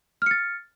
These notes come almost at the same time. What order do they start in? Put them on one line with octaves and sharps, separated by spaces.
F6 C#7 A6